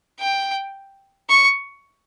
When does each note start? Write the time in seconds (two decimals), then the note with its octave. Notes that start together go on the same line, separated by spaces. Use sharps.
0.20 G5
1.29 C#6